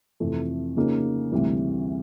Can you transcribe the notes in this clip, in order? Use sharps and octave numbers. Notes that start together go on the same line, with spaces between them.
F2 C3 E3 A3
C#3 F3 A#3 D#4
D2 C3 E3 G3